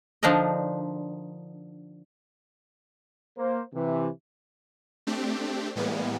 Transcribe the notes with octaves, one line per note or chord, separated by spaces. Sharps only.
D3 F3 D4 D#4 A#4 D#5
A#3 C5
C3 E3
A3 C4 D4 G4
A2 E3 G3 G#3 A#3 B3